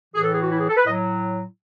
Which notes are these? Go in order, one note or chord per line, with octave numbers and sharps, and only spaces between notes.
A2 E3 G#4
A4
G#4
F#4
E4
G#4
A4
B4
A2 F#3 D#5